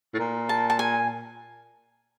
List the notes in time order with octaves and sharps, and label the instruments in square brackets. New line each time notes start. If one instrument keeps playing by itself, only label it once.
[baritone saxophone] A2
A#2
[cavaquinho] A5
A5
G#5